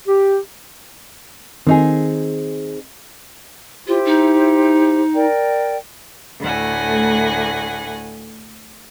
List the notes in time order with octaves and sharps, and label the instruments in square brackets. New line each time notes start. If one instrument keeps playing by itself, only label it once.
[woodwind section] G4
[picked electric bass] D#3 [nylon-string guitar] C4 D#4 G#4
[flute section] E4 G4 C5 [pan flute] F4
[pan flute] D#4
[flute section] A#4 D5 G5
[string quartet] D2 A2 F#5 G#5